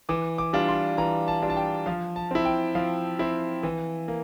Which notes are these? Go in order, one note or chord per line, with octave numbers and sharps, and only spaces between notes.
E3 D6
D6
G3 D4 F4
C6
E3 A#5
A5
G3 D4 F4
A5
G5
F3 F5
A5
C4 E4
G5
F3 F5
C4 E4
E3
A#3